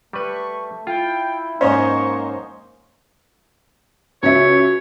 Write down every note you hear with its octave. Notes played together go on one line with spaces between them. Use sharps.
G3 A3 B4 C#6
E4 F4 G5
G#2 A#3 C#4 C5 C#5 D#5 C#6
C#2 F#4 C#5 E5